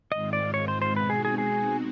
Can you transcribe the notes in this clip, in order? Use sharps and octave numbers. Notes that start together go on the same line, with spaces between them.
G#2 D#3 G#3 C4 F4 D#5
D5
C#5
C5
C5
B2 G#3 C4 D#4 F#4 B4
G#4
G#4
G#4